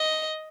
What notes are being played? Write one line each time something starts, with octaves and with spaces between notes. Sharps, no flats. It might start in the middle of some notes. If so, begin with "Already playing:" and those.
Already playing: D#5